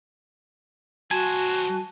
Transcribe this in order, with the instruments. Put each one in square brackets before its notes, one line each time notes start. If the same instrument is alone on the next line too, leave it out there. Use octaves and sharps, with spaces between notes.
[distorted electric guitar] F#3 C5 [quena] F#4 [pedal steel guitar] G#5 [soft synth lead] A5